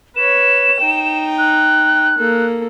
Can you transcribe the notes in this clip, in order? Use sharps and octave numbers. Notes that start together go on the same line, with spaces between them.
B4 C#5 E7
D#4 G5
F#6
A#3 A4